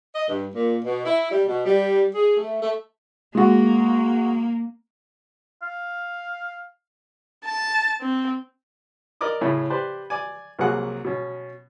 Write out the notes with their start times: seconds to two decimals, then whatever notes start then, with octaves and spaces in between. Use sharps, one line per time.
0.15 D#5
0.27 G2
0.54 A#2
0.83 B2
1.05 E4
1.30 G3
1.46 B2
1.65 G3
2.14 G#4
2.37 A3
2.61 A3
3.35 G#3 A#3 F#4
5.62 F5
7.45 A5
8.01 C4
9.21 A#4 D5 D#5 D6 D#6
9.41 A2 C#3 A3
9.70 G4 B4 C5 D5
10.10 D5 G#5
10.59 C2 F#3 A#3 G#4 F#5
11.05 B2 C#4